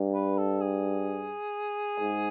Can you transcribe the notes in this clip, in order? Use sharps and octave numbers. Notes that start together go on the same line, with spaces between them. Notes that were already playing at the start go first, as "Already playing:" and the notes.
Already playing: G2
B4
A4
G#4
G#2